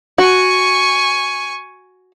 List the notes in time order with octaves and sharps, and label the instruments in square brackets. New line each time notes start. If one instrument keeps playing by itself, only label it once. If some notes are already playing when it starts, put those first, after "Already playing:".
[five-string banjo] F#4 [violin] G#5 C#6